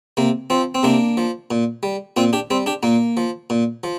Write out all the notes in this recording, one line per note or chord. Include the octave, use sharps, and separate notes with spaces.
C3 A#3
F3 C4
C4
C3 A#3 D4
F3
A#2
G3
A#2 C4 F4
D4 G4
G3 C4
D4 G4
A#2 A#3
F3
A#2
F3